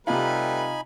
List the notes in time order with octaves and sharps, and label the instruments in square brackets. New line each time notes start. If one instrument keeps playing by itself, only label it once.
[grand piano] C3 F4 [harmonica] G3 A3 B4 [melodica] D#4 G#5 B5